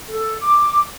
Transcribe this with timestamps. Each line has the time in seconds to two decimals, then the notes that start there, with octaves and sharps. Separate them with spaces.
0.09 A4
0.41 D6